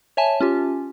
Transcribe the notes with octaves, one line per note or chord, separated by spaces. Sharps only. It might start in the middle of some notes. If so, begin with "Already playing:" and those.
C#5 E5 G#5 A5
C#4 F4 G4